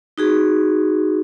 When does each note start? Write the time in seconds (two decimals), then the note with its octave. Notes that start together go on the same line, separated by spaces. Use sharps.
0.18 D#4 F#4 G#4